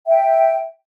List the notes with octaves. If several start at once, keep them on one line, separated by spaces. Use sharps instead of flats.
E5 G5